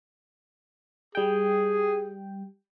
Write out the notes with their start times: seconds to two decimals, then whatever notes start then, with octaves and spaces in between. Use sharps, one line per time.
1.15 G3 G#4 G5